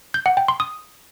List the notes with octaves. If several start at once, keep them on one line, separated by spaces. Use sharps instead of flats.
G6
F#5
G5
C6
D#6